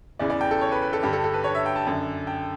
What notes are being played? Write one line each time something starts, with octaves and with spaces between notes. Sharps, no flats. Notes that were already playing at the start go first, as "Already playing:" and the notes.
E2 C#3 E3 D5
D5
G5
A4
C#5
B4
B4
A4
G2 D3 G4
A4
A4
B4
C#5
E5
G5
A5
F#2 D3
G5